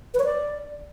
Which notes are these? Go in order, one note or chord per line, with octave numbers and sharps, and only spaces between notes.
B4
C#5
D5